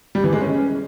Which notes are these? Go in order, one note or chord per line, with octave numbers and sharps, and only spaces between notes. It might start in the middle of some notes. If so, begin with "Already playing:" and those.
G3
E3
G#3
C#4